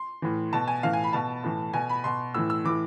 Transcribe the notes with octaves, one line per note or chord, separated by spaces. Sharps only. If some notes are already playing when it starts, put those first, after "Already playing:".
Already playing: C6
A2 E3
B2 A5
G#5
A2 E3 F5
G#5
B5
B2 A5
A2 E3
B2 G#5
B5
B2 C6
A2 E3 E6
E6
A2 E3 D6